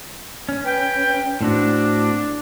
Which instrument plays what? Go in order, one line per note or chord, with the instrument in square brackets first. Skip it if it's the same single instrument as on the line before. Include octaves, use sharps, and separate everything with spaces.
[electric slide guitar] C#4
[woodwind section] B4 G5
[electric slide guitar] A2 C4 F#4 [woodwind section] D4